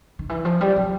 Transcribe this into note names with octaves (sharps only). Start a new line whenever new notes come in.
D#3
E3
F3
G3
F#3